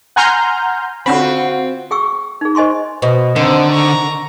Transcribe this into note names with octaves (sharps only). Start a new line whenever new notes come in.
F#5 G#5 A#5 C6 F6 G6
D3 C4 C#4 F4 F#4 F#5 B5
G#4 G5 C#6 E6
D#4 G#4
C5 D#5 G#5 C6 C#6
B2 C5 D#5
D3 D#3 C4 D#4
A#5 C#6